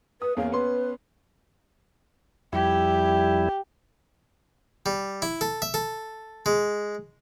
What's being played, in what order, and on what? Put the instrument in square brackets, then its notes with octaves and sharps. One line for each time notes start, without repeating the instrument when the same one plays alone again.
[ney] B4 [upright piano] D#6
[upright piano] E2 A#3 C#4 [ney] F5
[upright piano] B3 C#4 C6 [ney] B4
[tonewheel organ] F2 G3 E4 [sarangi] G4
[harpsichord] G3
E4
A4
E5
A4
G#3